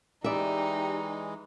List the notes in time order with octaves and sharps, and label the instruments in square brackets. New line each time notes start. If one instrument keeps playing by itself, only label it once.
[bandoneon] E3 G#3 [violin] D#4 [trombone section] G4 [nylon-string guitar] D5 E5